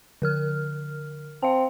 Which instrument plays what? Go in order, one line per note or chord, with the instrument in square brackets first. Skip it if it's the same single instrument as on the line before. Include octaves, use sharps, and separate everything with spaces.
[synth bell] D3 A#4 F6
[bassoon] C4 [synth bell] F5 A5